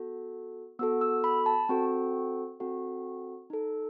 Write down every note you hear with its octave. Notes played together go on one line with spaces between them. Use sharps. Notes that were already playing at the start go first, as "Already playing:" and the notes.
Already playing: B3 F#4 A4
B3 F#4 A4 E6
E6
B5
A5
C4 F#4 A4
C4 F#4 A4
D#4 A4